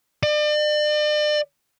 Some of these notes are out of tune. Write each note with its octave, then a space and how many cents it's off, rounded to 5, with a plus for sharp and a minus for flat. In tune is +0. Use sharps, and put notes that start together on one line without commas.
D5 +40